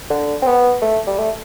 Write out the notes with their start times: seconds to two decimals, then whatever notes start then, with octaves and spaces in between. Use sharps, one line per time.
0.10 D3
0.42 C4
0.46 B3
0.82 A3
1.07 G3
1.18 A3